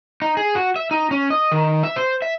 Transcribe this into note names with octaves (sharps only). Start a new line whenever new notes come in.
D#4
G#4
F#4
E5
D#4
C#4
D#5
D#3
E5
C5
E5